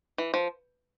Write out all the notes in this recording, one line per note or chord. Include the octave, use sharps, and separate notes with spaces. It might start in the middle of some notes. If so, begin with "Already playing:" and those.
E3
F3